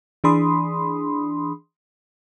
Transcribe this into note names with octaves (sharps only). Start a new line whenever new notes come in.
E3 D4 G#4 B5 C6 D#6